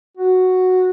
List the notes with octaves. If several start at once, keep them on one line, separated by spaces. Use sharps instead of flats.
F#4